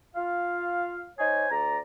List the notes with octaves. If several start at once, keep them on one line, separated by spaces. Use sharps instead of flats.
F4 F5
D#4 C5 C#5 G#5
D2 D5 A#5